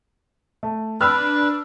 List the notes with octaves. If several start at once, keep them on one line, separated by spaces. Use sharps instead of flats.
A3
D4 B4 B5 E6 F6